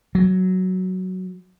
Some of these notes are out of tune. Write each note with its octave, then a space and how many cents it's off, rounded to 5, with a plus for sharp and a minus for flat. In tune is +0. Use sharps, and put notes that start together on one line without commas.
F#3 +5